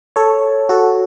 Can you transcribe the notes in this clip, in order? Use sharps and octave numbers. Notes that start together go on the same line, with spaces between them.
A4 C#5
F#4 A4